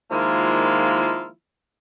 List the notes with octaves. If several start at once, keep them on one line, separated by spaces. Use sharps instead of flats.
D#3 F3 G#3 A#3 E4 F4